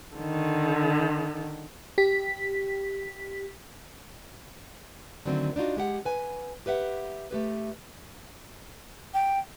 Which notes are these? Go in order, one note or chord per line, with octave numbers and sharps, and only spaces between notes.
D3 D#3
G4 B6
D3 D#3 F#3 A3 C4
D4 D#4 F4 F#4
G#3 G4 F#5
B4 G#5
G4 B4 E5 F#5
A3 G4 B4
G5